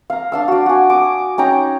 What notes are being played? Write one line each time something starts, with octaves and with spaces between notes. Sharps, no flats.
F5 A#5
D4 F5 E6
F#4 D5
F#4 G#5
D6 D#6
C#4 D#4 G5 A#5